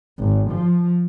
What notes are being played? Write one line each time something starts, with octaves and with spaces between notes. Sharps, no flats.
G#1
F3